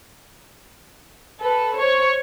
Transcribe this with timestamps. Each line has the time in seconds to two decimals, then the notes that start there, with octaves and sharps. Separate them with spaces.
1.40 A4 B4
1.76 C5 C#5 C#6